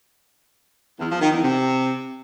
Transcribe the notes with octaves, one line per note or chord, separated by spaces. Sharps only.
E2
F3
D#3
E2
C3